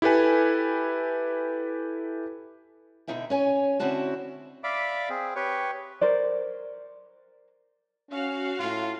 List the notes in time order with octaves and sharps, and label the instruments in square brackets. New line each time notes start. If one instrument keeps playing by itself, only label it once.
[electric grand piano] E4 G4 A4 B4 G#5
[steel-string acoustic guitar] B2 D3 A#3 D#4 E5 G5
C#4 C#5 G#5
D3 C4 C#4 E4 F#4 A5
[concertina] D5 E5 F5 B5 D6
C4 G#4
G4 B4 C#5
[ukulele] A#4 C5 D5
[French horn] C#4 [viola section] F#4 F5
[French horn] A2 [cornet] F4